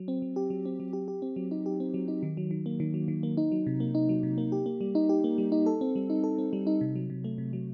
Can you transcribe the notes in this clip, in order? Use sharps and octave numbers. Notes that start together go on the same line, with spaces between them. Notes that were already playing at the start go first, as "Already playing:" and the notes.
Already playing: F#3
C4
F#3
G4
F#3
C4
F#3
G4
G4
C4
F#3
D#4
G4
C4
F#3
D#4
D#3
F#3
D#3
A#3
D#3
F#3
D#3
A#3
D#4
F#3
C3
A#3
D#4
F#3
C3
A#3
G4
A#3
G3
D#4
G4
A#3
G3
D#4
A4
C4
G3
D#4
A4
C4
G3
D#4
C3
F#3
C3
A3
C3
F#3